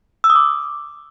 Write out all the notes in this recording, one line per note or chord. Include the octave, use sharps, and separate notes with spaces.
E6
D#6
D6